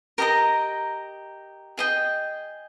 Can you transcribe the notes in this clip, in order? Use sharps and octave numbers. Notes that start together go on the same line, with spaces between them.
G4 A#4 D#5 A#5
G#4 D#5 G5